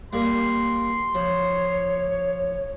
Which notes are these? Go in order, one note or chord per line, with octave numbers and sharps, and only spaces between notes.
G3 A#3 C6
F3 C#5